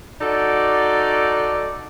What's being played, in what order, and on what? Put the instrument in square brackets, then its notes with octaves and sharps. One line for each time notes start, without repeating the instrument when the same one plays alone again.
[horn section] D#4 F#4 A4 D5